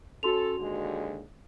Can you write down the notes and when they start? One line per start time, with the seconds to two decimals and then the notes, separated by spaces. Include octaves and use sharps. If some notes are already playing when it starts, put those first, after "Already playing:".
0.23 C#4 F#4 A4 C6 F7
0.59 D#2 D3 G#3